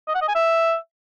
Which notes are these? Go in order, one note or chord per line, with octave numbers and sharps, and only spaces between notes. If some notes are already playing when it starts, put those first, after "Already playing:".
D#5
F#5
D#5
G#5
E5